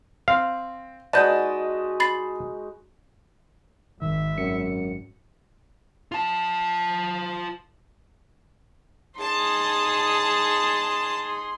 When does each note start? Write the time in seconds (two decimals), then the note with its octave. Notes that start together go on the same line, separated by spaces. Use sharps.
0.28 C4 F5
1.13 G#3 D#4 F#4 B4 D5 D#5 A5 G6
2.00 B5 A6 C7
4.02 G#1 D#3 E5
4.38 F#2 C#7
6.12 F4 A5
9.20 D#4 G#4 A5 C6